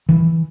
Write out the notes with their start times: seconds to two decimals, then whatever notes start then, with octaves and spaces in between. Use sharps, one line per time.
0.09 E3